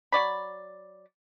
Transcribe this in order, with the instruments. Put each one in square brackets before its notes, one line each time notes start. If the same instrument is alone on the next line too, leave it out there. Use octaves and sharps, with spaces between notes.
[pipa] F#3 D5 B5